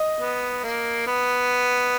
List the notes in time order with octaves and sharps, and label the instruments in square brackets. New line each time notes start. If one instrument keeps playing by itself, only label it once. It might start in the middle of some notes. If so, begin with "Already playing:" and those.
Already playing: [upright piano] D#5
[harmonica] B3
A#3
B3